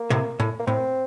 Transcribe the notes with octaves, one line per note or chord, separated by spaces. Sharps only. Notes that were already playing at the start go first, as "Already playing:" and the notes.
Already playing: A#3
A2 C3
A2
A#3
A2 C4